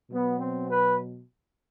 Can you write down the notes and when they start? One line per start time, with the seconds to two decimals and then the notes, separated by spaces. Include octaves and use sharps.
0.11 B2 F#3 B3
0.39 C4
0.68 B4